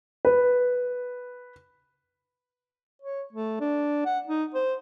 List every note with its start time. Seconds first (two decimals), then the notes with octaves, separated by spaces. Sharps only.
0.25 B4
3.02 C#5
3.33 A3
3.60 D4
4.06 F#5
4.28 D#4
4.54 C5